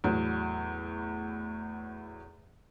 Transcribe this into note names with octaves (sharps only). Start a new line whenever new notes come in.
E2 A2 F#3